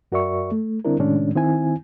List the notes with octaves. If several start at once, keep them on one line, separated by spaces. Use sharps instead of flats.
F#2 F#4 A#4 D5 E5 C#6
A3
D3 G3 C4 D4 E4 A#4
A2 C3 D#3 G#3 C#4 D4
D#3 C4 E4 G#5